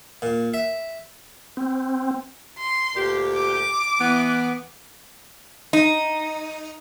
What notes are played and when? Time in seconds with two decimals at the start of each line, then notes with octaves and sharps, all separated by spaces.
0.22 A#2
0.54 E5
1.57 C4
2.58 C6
2.95 D2 A#2 G4
3.35 D6
4.00 E3 B3
5.73 D#4